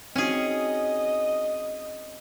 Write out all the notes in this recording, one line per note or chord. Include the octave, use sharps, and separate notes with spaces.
C4 C#4 D#4 F#4 G#4 D#5